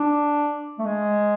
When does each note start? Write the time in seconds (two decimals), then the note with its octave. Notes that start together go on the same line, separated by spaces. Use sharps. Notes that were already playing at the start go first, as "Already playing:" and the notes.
Already playing: D4
0.79 A3
0.85 G#3